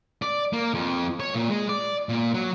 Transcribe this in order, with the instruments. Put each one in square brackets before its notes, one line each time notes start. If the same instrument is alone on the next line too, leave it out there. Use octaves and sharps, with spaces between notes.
[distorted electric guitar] D5
A#3
F2
C#5
A#2
G#3
D5
A#2
F#3